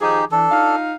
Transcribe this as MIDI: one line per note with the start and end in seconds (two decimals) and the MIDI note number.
0.01 0.23 51
0.01 0.23 53
0.01 0.25 63
0.01 0.25 67
0.01 0.23 68
0.32 0.46 52
0.32 0.76 62
0.32 0.76 69
0.51 0.94 63
0.51 0.94 65
0.51 0.94 77